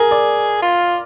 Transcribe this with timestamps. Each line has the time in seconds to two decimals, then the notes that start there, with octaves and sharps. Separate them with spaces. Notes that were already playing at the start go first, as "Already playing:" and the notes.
Already playing: G#4 A#4
0.11 D5
0.62 F4